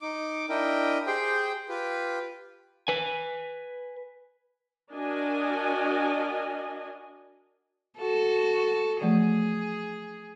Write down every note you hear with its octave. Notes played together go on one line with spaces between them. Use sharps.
D#4 D6
D4 E4 A#4 D#5 G5
G4 G#4 C5 G5
F4 G4 B4
B4 G#5
D4 F#4 A#4 D#5 G#5
F#4 A4
E3 F3 A3 G#4